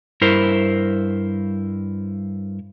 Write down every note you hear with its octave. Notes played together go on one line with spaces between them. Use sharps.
G2 E4 A#4 C5